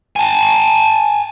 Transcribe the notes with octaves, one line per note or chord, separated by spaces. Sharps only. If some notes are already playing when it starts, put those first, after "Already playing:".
G#5 A5